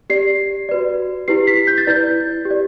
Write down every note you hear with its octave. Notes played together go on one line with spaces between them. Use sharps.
G4 D5 C7
F#4 B4 D5
E4 G4 B4 C7
B6
G6
A6
E4 B4 D5 G6
G4
D5